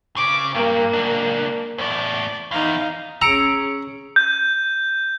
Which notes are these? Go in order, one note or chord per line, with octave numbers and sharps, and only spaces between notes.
C#3 D6
G2 A#3
C#2 D4
E2 A2 D5
E2 D#4 F5
C#4 G#4 A#5 E6 C#7 D7
G6